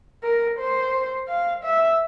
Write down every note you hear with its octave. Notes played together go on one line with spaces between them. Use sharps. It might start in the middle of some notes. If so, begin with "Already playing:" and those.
A#4
C5
F5
E5